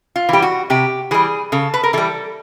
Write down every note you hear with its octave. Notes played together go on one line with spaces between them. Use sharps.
F4
E3 G3 G4
F#4
C3 G4
E3 G3 G#4
C#3 A4
B4
A#4
E3 G3 A4